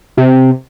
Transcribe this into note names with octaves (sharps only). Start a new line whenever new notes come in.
C3